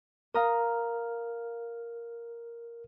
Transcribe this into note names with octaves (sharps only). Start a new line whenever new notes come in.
A#4 F5 A#5 D#6 F6